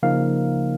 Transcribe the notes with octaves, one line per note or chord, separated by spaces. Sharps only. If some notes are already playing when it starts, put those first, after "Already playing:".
C#3 F3 A#3 D#4 F5